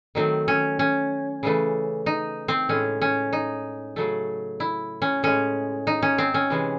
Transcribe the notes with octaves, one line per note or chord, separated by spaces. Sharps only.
D#3 F#3 A3 C4
C#4
C#4
C#3 E3 A3
D#4
C4
A2 G#3 C#4
C#4
D#4
C#3 F#3 A3
E4
C#4
A2 G#3 C#4
D#4
C#4
C4
C#4
C3 E3 G#3